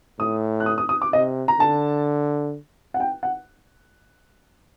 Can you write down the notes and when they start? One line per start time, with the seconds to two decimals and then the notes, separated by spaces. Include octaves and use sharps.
0.19 A2 D#6
0.60 F#6
0.66 D#6
0.78 D#6
0.89 D#6
1.02 D6
1.13 C3 D#5
1.48 A#5
1.59 D3 A5
2.94 F#5
3.00 G5
3.23 F#5